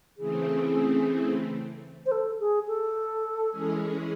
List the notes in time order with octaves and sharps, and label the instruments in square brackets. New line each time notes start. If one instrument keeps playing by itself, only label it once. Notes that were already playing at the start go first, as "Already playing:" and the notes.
[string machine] C#3 E3 A3 C4 [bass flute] G#4
[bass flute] C5
A4
G#4
A4
[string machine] E3 G#3 C#4 G#4